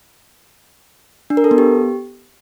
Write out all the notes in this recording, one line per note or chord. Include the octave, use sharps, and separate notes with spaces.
D4
A#4
A4
B3
G4